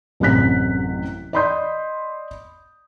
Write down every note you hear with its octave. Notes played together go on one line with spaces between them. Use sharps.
A1 F#2 C3 F#6 B6
D5 D#5 B5 C6 D#6 G6